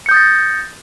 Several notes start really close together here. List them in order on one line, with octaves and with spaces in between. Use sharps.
C#7 G6 D#6 A6 A#6